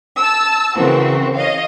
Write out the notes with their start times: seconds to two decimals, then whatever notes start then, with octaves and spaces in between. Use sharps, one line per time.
0.17 A5 E6
0.76 C#3 E3 C4 F#4 A#4
1.34 C#5 D#5 F5